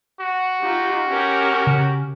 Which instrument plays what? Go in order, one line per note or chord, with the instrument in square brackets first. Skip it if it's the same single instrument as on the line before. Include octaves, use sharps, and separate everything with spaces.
[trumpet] F#4
[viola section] D#4 F4 G4
C#4 G4 A#4
[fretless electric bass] C#3